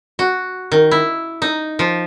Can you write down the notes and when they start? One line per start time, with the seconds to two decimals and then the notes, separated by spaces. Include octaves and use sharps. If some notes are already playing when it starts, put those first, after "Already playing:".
0.19 F#4
0.72 D#3
0.91 E4
1.42 D#4
1.79 F3